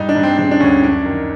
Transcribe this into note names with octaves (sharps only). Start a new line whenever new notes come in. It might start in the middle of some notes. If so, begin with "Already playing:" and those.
Already playing: G2 D#4
D4
G2
C4
C#3 C4
D4
D2 C#4
F#2 D4
D#3